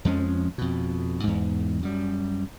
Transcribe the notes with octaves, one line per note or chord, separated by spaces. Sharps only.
F2 F3 G#3 C#4
F2 B2
E2 G#2
F#2 G3